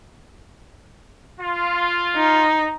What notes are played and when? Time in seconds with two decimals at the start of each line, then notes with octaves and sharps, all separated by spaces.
1.40 F4
2.16 D#4